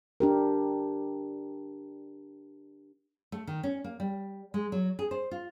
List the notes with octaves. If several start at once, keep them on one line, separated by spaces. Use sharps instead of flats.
D4 G4 A#4
A3
D#3
C#4
A#3
G3
G#3
F#3
G#4
C5
F4